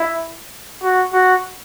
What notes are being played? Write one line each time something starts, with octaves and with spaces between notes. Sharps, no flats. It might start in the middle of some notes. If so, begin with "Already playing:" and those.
Already playing: E4
F#4
F#4